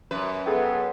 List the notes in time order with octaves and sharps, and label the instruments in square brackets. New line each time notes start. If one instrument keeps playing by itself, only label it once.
[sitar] F#2 B4
[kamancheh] B3 [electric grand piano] G#4 A4 G5